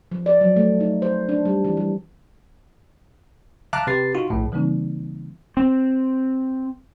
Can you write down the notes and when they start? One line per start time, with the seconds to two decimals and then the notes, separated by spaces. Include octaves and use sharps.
0.11 F3
0.26 D5
0.41 F#3
0.56 A3
0.80 D#4
1.02 C5
1.29 D4
1.45 G3
1.65 E3
1.77 G3
3.73 E5 F5 A5 A#5 D6 F#6
3.87 C3 G4 B4 A6 C7
4.15 D#4 F4 F#4
4.30 A#1 A2
4.52 C#3 E3 G3 A#3 C4 D#4
5.57 C4